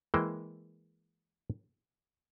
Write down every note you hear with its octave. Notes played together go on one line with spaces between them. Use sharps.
E3 G#3 A#3 C5 G5